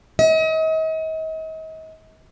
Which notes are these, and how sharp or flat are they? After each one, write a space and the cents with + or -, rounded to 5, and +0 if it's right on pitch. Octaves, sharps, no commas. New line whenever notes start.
D#5 +40